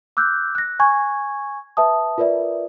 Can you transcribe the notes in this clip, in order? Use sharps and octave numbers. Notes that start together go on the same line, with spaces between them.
D6 E6 F#6 G6
F#6 A#6
G#5 C#6 G#6
B4 E5 A5 D#6
F4 A#4 B4 D5 E5